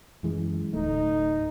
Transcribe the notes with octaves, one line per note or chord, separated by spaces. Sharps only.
F#2 E3 G#3
D1 A3 D#4